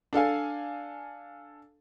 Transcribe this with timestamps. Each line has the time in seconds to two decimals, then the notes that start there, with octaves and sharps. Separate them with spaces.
0.13 D4 A4 F5 G#5